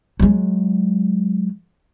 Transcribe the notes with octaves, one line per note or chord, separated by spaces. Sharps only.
F#3 G#3